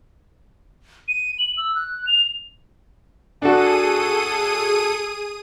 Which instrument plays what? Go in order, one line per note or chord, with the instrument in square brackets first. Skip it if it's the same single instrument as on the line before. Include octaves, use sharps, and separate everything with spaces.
[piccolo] D#7
F#7
E6
F#6
F7
[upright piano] D4 F#4 [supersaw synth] G#4 D#6 D#7 [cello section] A4